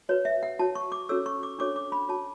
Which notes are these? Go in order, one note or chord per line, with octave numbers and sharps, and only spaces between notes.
F#4 B4 C#5
E5
F#5
F#4 C#5 A5
C#6
D6
C#4 F#4 A4 C#5 E6
C#6
D6
D4 F#4 A4 C#5 D6
D6
B5
F#4 C#5 A5